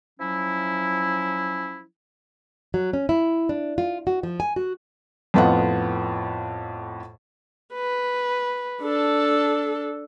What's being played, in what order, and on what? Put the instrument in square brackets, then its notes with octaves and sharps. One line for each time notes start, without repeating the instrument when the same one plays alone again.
[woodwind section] F3 F#3 C#4 E4
[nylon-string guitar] F#3
C#4
E4
D4
F4
F#4
F3
G#5
F#4
[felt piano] F2 A2 B3 F4 D#5 F#5
[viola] B4
D4 A4